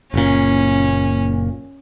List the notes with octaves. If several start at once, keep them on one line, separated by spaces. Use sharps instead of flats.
F#1 A#2 C#4